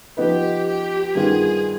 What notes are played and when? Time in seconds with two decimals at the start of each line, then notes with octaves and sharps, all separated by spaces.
0.17 F3 B3 D#4 G4 B4
0.67 G4
1.15 G2 D#3 B3 F4 G#4